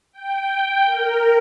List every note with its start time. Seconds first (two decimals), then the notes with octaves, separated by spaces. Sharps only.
0.12 G5
0.84 A#4